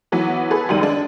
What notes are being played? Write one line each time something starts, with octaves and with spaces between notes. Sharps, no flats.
E3 F#3 B3
G#4 A4 B4
C#2 F#2 D#3 G3 D#7
G#3 D4